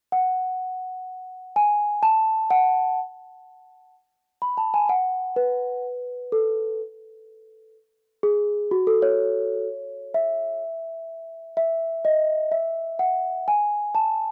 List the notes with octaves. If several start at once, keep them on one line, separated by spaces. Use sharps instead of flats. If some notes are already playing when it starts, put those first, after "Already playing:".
F#5
G#5
A5
F#5
B5
A5
G#5
F#5
B4
A4
G#4
F#4
A4
C#5
E5
E5
D#5
E5
F#5
G#5
A5